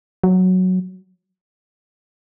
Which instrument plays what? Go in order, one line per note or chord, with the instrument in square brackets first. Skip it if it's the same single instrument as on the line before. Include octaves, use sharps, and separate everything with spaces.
[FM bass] F#3